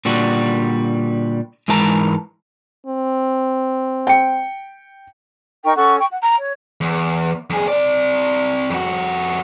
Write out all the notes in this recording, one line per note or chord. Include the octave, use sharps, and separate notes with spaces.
A#2 D3 G3 F#4
G#2 E3 G#3 A#4 A5 A#5
C4
G5 C#7
D#4 A#4 G5 C#6
C#4 A4 F#5 C#6
G5 C#6
F#5
A#5
C#5
E2
F2 G#4
C4 D5
F2 F#4